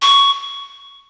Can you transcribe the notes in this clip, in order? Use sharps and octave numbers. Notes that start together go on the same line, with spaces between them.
C#6